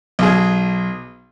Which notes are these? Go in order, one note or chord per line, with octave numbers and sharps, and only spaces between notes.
B1 G#4